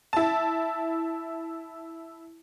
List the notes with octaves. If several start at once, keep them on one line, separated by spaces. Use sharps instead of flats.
E4 A5